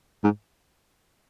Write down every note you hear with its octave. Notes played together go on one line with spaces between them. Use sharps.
G#2